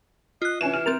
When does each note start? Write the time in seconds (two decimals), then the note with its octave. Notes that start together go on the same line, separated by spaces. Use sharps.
0.42 F4 D#5 F#6
0.61 E3 C#4 G#5 E7
0.73 F6 E7
0.86 C4 A#4 A6 F7